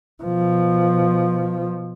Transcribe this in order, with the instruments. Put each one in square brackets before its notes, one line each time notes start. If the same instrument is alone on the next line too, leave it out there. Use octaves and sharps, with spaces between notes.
[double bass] B2 F3